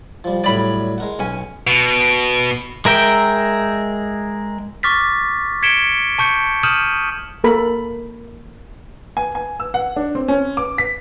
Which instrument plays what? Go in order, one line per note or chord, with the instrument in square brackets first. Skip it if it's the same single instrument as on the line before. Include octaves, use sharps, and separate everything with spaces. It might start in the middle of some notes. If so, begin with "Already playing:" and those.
[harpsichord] F3 G3
[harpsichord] A2 F#3 G3 [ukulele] D5 B5
[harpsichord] G#3 A#4 F#5
[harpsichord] B1 [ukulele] C#4 G#5
[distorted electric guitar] B2
[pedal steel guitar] G#3 A#4 E5 G5
[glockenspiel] C#6 D6 F6 A6 B6
G#6 B6 C#7 D7 E7 G7
A5 C#6 G6 C#7
D#6 F6 G6 D#7 E7 F#7
[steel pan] A#3 A4 A#4 B5
[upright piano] G#5
G#5
E6
F#5
D4
C4
C#4
D6
B6